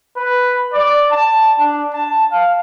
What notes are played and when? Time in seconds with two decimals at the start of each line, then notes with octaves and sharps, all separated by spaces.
0.16 B4
0.73 D5
1.11 A5
1.59 D4
1.94 A5
2.31 F5